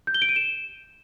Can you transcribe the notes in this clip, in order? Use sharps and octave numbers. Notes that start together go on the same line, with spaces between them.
G6
G7
D7
D#7
E7